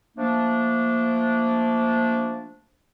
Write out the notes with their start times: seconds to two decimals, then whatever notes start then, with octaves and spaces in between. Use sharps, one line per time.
0.16 F3 A3 A#3 D4